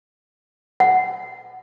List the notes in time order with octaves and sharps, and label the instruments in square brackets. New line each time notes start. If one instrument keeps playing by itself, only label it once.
[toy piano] F#5